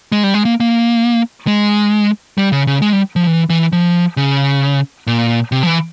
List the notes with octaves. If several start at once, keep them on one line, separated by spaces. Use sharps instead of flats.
G#3
G3
G#3
A#3
A#3
G#3
G3
C#3
C#3
G#3
G3
F3
E3
E3
F3
C#3
A#2
C3
F3
E3